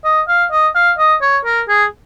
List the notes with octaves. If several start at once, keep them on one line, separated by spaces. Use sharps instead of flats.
D#5
F5
D#5
F5
D#5
C#5
A#4
G#4